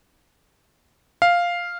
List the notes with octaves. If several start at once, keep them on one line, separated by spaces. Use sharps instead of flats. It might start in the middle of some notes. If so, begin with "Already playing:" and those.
F5